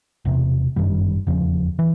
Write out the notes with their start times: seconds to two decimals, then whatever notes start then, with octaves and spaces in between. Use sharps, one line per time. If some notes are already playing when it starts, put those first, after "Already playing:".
0.25 E1 E2 C3
0.76 G1 F#2 D#3 G3
1.27 F1 E2 C#3 F3
1.79 E3